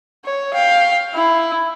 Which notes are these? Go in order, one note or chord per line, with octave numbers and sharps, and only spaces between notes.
C#5
F5 G5
E4